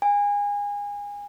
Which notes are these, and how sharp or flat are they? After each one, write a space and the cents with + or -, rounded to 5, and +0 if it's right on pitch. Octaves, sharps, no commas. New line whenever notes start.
G#5 -30